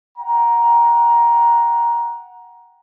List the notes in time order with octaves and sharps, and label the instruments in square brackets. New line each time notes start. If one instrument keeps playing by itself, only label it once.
[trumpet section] F#5 G5 A#5